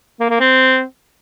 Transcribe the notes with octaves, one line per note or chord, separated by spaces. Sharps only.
A#3
A#3
C4